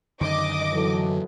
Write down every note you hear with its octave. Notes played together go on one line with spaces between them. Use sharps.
F#2 D3 D#3 D#5 D6
E3 F#3 A4